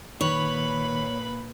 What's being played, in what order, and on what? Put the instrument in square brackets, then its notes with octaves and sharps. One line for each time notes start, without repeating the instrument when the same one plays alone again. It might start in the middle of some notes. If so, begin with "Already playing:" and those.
[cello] A#2 [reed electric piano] D#3 [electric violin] B4 B5 [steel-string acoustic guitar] C#5